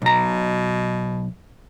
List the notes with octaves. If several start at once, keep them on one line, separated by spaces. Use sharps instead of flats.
B1 B2 A#5